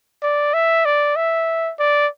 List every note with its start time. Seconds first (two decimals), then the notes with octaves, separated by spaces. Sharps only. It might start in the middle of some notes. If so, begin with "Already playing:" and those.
0.22 D5
0.54 E5
0.85 D5
1.16 E5
1.79 D5